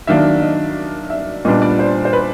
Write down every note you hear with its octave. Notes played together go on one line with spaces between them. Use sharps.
D#3 F#3 A#3 D4 E5
D#5
E5
A#2 G3 B3 D4 D#5
D5
C5
C5
B4